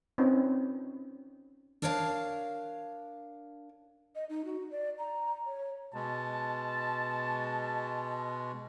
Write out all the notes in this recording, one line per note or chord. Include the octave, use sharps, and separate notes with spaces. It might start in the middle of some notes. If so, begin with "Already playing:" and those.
C4 C#4 D#4 F4 B4
D4 A#4 C#5 F5 G#5 A5
D#5
D#4
F#4
D5
A#5
C#5
B2 G#3 A5